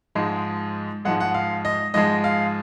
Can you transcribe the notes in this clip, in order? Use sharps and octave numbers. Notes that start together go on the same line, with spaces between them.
G#2 F3 G#3
G#2 F3 G#3 F#5
F#5
F5
D#5
G#2 F3 G#3 D#5
F5